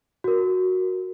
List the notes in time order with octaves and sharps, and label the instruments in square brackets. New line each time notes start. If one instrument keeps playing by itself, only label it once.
[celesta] F#4 A#4